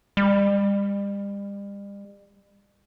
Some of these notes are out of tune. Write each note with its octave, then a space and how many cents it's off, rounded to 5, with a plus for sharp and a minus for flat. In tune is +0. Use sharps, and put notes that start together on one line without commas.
G3 +40